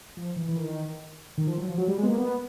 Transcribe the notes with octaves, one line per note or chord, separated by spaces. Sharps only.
F3
E3
E3
D#3
D#3
F3
F#3
F3
F#3
G3
G#3
B3
A#3
B3